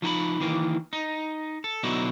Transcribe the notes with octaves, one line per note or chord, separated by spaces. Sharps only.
F3 D#4 G5 B5
D#3 E3 A#3
D#4
A4
B2 D3 F#3 D#4 E4